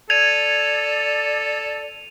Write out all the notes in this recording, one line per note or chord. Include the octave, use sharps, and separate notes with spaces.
A4 D5 G#6 D#7 F7